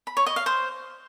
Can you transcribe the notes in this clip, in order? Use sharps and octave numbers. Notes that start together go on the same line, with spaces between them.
B5
C#5
D#5
F5
C5